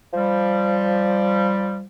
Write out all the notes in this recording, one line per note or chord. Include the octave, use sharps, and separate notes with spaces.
F3 G3